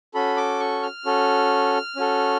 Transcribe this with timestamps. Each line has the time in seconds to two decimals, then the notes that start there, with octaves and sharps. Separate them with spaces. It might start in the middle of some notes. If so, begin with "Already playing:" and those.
0.14 C#4 F#4 A4 B5
0.37 D6
0.60 C#6
0.83 F6
1.05 C#4 F#4 A4
1.96 C#4 F#4 A4